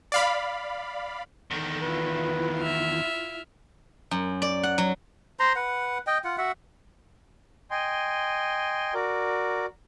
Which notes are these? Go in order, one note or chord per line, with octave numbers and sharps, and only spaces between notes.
D5 F5 B5
E2 D#3 A4
E4 F4 B4
E5 F6
F#2
D5
F#5
F#3
C5 A#5 C6
B4 F#5
D#5 G5
F4 F#5
F#4 E5 F#5
D#5 G5 G#5 C6
F#4 A#4 D5